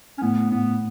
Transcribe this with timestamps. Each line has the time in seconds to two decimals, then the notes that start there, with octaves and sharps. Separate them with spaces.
0.18 C#4
0.22 A2 B3
0.51 A2 B3